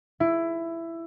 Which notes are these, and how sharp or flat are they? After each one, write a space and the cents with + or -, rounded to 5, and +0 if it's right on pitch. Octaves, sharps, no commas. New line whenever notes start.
E4 +15